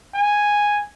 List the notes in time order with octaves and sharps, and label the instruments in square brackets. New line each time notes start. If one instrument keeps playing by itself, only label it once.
[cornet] G#5